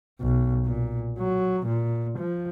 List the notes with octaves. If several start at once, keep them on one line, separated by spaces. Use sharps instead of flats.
B1
A#2
F#3
A#2
F3